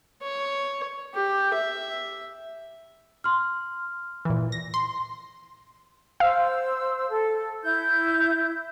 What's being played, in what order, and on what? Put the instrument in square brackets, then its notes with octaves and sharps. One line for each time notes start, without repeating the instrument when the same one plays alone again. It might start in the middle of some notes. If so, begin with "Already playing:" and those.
[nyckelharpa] C#5
G4
E5
[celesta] C6 F6
[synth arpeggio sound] A#2 E3
A#6
C6
[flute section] C5 E6 [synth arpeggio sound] F5
[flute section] A4
E4 G6